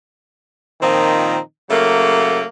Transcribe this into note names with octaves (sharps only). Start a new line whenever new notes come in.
A#2 D#3 F3 C4 D#4
C#3 F#3 A3 A#3